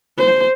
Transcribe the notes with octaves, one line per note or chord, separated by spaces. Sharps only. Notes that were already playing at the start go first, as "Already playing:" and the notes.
C5